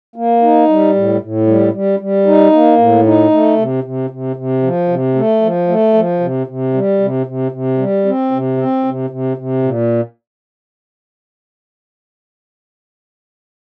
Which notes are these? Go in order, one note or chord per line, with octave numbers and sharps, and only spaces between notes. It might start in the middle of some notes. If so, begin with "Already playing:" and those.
A#3
D#4
G3
A2
A2
G3
G3
G3
D#4
A#3
A2
D#4
A3
C3
C3
C3
C3
F3
C3
A3
F3
A3
F3
C3
C3
G3
C3
C3
C3
G3
C4
C3
C4
C3
C3
C3
A#2